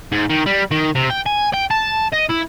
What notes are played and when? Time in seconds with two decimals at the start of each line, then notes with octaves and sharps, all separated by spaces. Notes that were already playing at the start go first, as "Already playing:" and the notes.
0.12 G#2
0.30 D#3
0.46 G3
0.71 D#3
0.95 C3
1.10 G5
1.26 G#5
1.54 G5
1.71 A5
2.12 D#5
2.29 E4